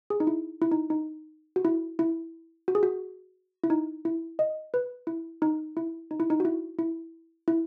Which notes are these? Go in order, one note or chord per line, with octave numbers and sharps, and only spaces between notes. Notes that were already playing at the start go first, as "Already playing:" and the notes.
G#4
D#4
E4
E4
D#4
D#4
F#4
E4
E4
F#4
G#4
F#4
E4
D#4
E4
D#5
B4
E4
D#4
E4
D#4
E4
D#4
F#4
E4
E4
E4